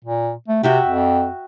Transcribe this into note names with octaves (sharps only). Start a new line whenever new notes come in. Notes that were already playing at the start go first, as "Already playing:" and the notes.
A#2
A3
C3 F#4 E5 G5
F2